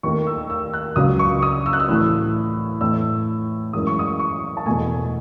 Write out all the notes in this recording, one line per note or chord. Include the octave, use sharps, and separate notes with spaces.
D#2 D#3 A3 C#6
E6
E6
F#6
C#2 C#3 F#3 D#6
C#6
D#6
E6
F#6
E6
A2 E3 A3
A2 E3 A3 E6
F#2 E3 G#3 D#6
C#6
D#6
C#6
A5
E2 B2 A3 G#5